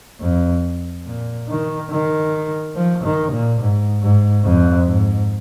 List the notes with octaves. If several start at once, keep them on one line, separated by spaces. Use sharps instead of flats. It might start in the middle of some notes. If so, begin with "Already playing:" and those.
F2
A#2
D#3
D#3
F3
D#3
A#2
G#2
G#2
F2
G#2